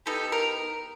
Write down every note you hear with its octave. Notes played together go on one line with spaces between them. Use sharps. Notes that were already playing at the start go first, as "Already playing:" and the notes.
B3 D#4 G4 A4
A#4